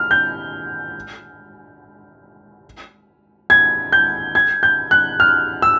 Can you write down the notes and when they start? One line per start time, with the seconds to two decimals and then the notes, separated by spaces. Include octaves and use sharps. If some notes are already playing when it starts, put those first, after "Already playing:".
Already playing: F6
0.11 G6
3.50 G#6
3.92 G6
4.35 G#6
4.63 G6
4.91 F#6
5.20 F6
5.62 E6